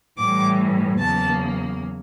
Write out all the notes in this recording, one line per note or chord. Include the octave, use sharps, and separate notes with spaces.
A2 E3 G3 D6
E2 C#3 F#3 A#3 A5